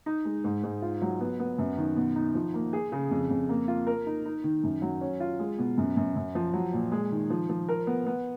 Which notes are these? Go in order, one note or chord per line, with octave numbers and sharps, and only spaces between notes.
D#4
G#3
G#2
G#2
F4
F#3
B3
B3
F#2
D#3
B2
D#4
F3
A#3
G#4
C#3
F2
F2
A#3
F4
A#4
D#4
D#4
D#3
F#2
F#3
C#4
F4
G#3
B2
F#2
F#2
F#2
F3
F#3
A#2
G#3
D#3
F3
F3
A#4
B3
B3